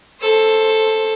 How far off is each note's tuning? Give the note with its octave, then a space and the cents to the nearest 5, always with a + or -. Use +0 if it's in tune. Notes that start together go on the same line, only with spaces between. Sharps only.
A4 +0 C5 +20